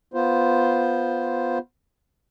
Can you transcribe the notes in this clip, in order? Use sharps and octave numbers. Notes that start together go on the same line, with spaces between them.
B3 F4 C5